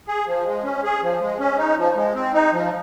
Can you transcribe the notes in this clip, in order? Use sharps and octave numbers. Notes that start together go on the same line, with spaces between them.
G#4
F3
G#3
C#4
G#4
F3
G#3
C#4
D#4
F3
G#3
C4
D#4
F3